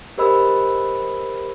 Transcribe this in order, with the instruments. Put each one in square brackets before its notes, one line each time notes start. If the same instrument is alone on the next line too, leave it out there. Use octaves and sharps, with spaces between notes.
[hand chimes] G4 A#4 C5 D#5 B5 E6